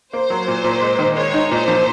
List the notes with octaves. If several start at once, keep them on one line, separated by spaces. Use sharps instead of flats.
A#3 C5
F#3
A#2
A#2
G#3
D#3
G#3 C#5
D#4
A#2 C5
F3